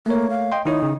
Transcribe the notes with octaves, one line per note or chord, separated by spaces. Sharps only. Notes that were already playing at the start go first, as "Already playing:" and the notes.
A3 A#3 C#5
F5
D#5 G5 C6
D#3 D#4 E4 C#5
C#3